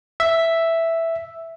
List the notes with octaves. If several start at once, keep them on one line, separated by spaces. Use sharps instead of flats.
E5